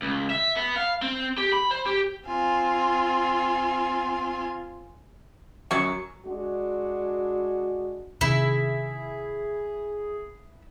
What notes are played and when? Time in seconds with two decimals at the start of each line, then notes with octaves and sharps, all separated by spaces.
0.02 C#2
0.30 E5
0.56 B3
0.76 F5
1.02 C4
1.38 G4
1.52 B5
1.71 C5
1.86 G4
2.27 C4 F4 G#5
5.71 F#2 F#3 C#6
6.25 G#3 D4 F#4
8.21 C3 D#3 E4 G#4